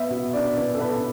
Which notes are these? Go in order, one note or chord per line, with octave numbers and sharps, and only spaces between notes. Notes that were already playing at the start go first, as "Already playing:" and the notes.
Already playing: B3 E5
B2
D4 D5
B3
A4
B3 B4